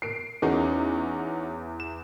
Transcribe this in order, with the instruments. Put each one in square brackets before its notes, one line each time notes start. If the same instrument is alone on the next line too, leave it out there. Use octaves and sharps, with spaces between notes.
[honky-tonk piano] C7 D7
[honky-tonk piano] E2 [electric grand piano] C#4 D#4 F#4
[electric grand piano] E7